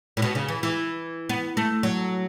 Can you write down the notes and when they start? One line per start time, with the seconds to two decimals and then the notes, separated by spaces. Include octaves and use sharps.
0.17 A2
0.22 B2
0.35 C#3
0.49 E3
0.63 E3
1.29 B3
1.57 A3
1.83 F#3